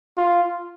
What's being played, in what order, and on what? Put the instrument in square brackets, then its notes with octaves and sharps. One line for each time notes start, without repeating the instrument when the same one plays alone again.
[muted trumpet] F4